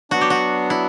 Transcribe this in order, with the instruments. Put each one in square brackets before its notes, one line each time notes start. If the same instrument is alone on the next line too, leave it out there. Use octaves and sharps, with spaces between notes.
[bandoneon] F#3 B3 D4 [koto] F#4
[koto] G4
F#4
E4